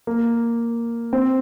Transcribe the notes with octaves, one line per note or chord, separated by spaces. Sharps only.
A#3
C4